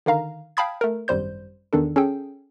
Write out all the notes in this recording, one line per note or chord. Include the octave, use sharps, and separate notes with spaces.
D3 D#3 F5 A#5
F5 G5 A5 B5 D#6 G#6
A3 A#4
G#1 F#2 G3 C5 G6
E2 D#3 D4 A4
C#4 G#4 A4 G5